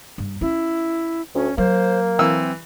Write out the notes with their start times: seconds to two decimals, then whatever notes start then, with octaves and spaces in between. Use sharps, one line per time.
0.18 G2
0.41 C#4 E4
1.35 D2 C#4
1.58 F#3 A#3 C5
2.19 E3 C4 E6